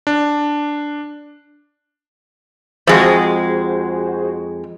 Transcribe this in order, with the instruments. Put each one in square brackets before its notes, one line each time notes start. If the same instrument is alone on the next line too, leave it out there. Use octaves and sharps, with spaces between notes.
[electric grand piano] D4
[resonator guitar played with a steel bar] F2 G#3 [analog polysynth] F#4 G#4 C5